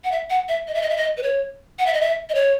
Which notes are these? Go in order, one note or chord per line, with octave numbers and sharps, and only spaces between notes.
F#5
E5
F#5
E5
D#5
E5
D#5
E5
D#5
B4
C#5
F#5
E5
D#5
E5
D#5
C#5